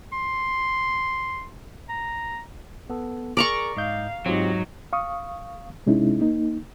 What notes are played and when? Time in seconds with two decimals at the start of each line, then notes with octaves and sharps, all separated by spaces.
0.12 C6
1.89 A#5
2.90 B3 A4
3.37 G#4 A#4 D5 A#5 C#6
3.77 G#2 D#5 F5 G6
4.26 G#2 F#3 C4 D#4 F4 G4
4.93 F5 C#6 D#6
5.86 C3 G#3 C#4 D#4 E4
6.21 A#3 D#4